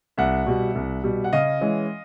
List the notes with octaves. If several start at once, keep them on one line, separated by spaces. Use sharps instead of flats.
C2 E5 F#5
B2 G3
C2
B2 G3
F#5
C#3 D#5 F5
E3 G#3 C#4